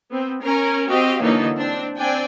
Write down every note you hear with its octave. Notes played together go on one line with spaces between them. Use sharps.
B3 C4
C#4 A#4
C4 F#4 G4 D#5 F5
D3 E3 F#3 A#3 D#4 A4
C4 D4
C4 D4 D5 G5 G#5